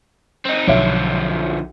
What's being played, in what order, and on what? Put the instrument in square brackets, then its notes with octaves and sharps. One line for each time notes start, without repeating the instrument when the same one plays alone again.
[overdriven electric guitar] C4 D#4
[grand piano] B1 C#5 E5 [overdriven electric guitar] D3 F3